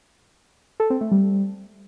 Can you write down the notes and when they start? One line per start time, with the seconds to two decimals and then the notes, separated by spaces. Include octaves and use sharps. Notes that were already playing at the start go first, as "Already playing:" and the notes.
0.80 A4
0.90 C4
1.01 A3
1.12 G3